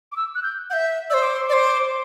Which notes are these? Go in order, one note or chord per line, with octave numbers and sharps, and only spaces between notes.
D6
E6
F#6
G6
E5 F#5 G6
C5 D5 E6
D6
C6
D5 D6
C5